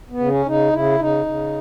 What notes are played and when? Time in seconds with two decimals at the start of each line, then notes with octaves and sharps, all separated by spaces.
0.10 B3
0.19 C#3
0.28 C#4
0.46 C#3 D#4
0.72 C#3 E4
0.99 C#3 D#4
1.26 C#3